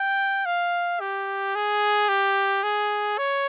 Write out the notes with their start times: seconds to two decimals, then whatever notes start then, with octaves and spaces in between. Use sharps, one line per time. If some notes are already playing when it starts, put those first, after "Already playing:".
Already playing: G5
0.46 F5
1.00 G4
1.55 G#4
2.09 G4
2.63 G#4
3.18 C#5